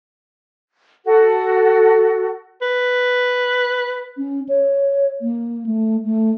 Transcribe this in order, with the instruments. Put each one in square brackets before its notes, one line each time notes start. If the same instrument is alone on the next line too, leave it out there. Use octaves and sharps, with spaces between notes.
[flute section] F#4 A4
[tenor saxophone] B4
[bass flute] C#4
C#5
A#3
A3
A3